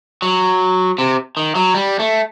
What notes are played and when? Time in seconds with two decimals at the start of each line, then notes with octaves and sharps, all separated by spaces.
0.22 F#3
0.98 C3
1.37 D#3
1.55 F#3
1.74 G3
2.00 A3